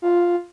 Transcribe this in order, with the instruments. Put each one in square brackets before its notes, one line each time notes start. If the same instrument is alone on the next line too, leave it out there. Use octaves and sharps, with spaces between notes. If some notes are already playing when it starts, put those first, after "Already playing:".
[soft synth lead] F4